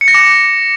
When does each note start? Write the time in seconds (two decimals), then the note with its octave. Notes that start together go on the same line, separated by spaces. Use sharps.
0.01 C#7
0.08 A#6
0.14 D6